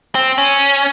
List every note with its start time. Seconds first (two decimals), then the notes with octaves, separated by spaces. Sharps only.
0.15 C4
0.38 C#4